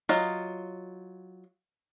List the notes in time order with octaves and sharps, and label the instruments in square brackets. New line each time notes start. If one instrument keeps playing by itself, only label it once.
[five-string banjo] F#3 F4 D#5